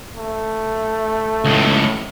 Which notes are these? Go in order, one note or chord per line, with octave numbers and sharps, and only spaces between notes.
A3
C#2 A2